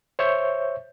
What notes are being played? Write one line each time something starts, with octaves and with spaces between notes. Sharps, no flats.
C5 C#5 E5 C#6 G6